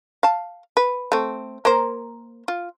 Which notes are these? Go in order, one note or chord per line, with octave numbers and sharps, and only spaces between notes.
F5 A5
B4
A3 C4
A#3 A#4 C5
F4